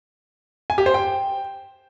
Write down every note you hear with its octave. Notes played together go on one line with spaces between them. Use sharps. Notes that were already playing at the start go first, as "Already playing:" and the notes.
G#5
G4
C5
G5